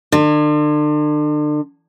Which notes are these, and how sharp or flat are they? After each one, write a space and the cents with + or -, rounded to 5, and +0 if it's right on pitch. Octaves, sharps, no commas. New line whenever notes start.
D3 +35